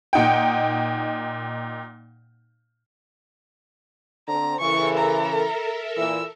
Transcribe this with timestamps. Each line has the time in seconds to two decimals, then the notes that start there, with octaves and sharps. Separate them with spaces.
0.13 A#2 D#4 F#5 G5
4.28 D3 C4 C5 A#5
4.60 C#3 E3 A4 A#4 E5 C#6
4.98 A#5
5.97 A#2 E3 E6